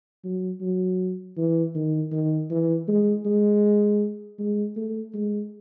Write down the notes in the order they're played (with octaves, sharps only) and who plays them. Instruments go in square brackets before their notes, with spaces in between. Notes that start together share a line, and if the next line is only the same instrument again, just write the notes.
[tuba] F#3
F#3
E3
D#3
D#3
E3
G#3
G#3
G#3
A3
G#3